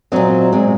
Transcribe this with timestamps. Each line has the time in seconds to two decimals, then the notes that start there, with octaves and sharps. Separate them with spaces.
0.12 A#2 F#3 C4 D#5
0.52 A#2 G#3 C4